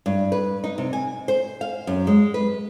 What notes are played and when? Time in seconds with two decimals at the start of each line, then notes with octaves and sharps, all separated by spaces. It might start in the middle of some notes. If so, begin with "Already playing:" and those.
0.06 G2
0.32 B4
0.64 D#4
0.78 C3
0.93 G#5
1.28 C5
1.61 F5
1.87 F#2
2.07 G#3
2.34 B4